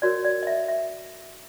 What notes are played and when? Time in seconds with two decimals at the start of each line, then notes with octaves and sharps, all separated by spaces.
0.02 F#4 A#4 C#5 D5
0.25 D5
0.43 D#5
0.47 E5
0.68 E5